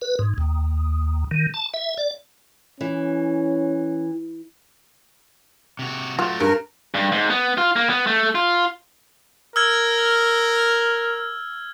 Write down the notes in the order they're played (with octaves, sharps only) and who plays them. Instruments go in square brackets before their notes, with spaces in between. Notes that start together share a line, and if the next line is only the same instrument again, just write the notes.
[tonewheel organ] B4
G#2
D#2
D#3
A5
E5
D5
[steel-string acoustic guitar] E3 [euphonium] C#4
[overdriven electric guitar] C3 F#4
[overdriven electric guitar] F#3 A3 [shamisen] F4 F#4
[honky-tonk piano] G2 [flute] A#4
[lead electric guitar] G2
G#2
B3
F4
A#3
B3
A3
F4
[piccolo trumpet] A#4 [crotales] E6 F6 G#6